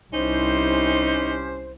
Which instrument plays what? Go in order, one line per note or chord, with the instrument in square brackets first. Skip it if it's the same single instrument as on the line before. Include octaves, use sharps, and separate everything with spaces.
[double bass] C2 E4 [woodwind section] C#4 G4 C5 [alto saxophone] D#4